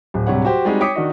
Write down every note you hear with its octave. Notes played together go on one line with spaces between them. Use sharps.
D1
D1 G2 C3 G3 C#5 F#5
F#4 G4 C5
G3 G#3 C4 D#4 F#4 G#4
C#5 G5 D6 D#6 B6 C#7
D#3 D4 F#4 D#5